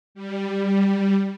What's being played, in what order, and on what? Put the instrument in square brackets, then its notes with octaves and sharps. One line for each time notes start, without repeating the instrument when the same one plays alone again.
[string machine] G3